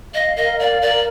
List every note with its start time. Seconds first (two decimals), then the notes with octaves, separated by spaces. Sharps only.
0.14 D#5 F5
0.36 A#4 D#5
0.58 D5 F5
0.81 A#4 D5